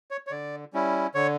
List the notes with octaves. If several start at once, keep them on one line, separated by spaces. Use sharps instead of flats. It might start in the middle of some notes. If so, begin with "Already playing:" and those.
C#5
C#5
D3 D5
G3 C#4 E4
D3 C#5